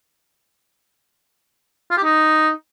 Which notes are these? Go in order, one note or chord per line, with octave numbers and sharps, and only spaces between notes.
F4
G4
D#4